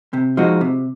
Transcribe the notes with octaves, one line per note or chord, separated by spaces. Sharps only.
C3
F3 G#3 D#4 F#4
C3